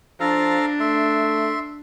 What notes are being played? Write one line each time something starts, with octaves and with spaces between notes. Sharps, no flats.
F3 D4 A4 F5 A#5
A3 E5 C6